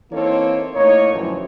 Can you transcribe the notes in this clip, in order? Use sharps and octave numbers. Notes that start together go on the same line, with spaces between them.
E3 A#3 C4 D#4 A4 C#5
A2 A#3 D#4 C#5
F#2 A2 D3 E3 F3